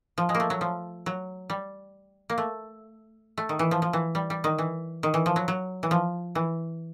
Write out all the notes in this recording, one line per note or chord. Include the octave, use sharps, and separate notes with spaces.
F3
G#3
A#3
A3
F#3
F3
F#3
G3
A#3
A3
A3
D#3
E3
F3
F3
E3
G3
G3
D#3
E3
D#3
E3
F3
F#3
F#3
E3
F3
E3